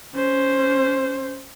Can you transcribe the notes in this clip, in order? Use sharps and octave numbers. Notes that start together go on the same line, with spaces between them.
C#4 C5